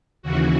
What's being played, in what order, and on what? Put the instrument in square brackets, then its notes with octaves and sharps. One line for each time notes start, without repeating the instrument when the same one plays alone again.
[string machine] D#2 C#3 E3 F#4